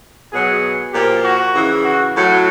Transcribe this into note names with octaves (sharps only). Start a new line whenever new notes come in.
B2 F#3 G#4
A#2 F3 G4
F#4
C#3 E3
F#4
A2 F#3